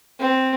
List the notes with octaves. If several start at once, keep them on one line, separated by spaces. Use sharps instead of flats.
C4